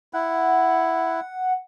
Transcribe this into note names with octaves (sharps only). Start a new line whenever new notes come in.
E4 F#5